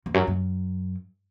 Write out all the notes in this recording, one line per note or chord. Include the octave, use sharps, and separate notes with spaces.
E2
F#2
F#2